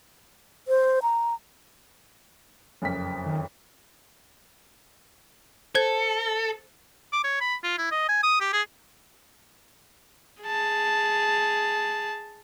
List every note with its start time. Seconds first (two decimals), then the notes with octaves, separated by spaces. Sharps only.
0.68 C5
1.02 A#5
2.82 F#1 F2 B6
3.26 D#3
5.75 A4 C5 G#6
7.12 D6
7.24 C#5
7.41 B5
7.64 F4
7.78 E4
7.92 D#5
8.09 G#5
8.23 D#6
8.40 G4
8.53 G#4
10.43 G#4 A5